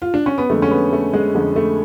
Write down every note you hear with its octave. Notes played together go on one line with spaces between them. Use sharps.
F4
D4
C#4
B3
F2 D3 G#3 A3
C#4
B3
A3
G#3
F2 D3 G#3
A3